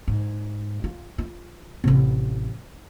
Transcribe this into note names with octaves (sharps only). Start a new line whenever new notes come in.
G#2
F4
F4
A1 C3